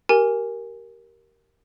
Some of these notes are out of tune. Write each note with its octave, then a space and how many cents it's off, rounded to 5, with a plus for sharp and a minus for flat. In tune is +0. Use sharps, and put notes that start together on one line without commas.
G4 -20 A#4 +0 G#5 -10